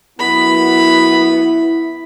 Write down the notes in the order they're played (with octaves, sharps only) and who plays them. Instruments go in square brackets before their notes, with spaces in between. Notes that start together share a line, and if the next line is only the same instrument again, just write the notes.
[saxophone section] F#2 B3 [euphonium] E4 [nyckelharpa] B5